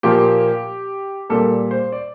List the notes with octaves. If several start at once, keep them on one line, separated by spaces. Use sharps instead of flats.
A#2 F3 A#3 G4
A#2 G3 A#3 A4
C5
D5